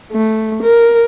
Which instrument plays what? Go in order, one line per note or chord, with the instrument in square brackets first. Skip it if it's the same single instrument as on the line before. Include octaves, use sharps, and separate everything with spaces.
[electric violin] A3
A#4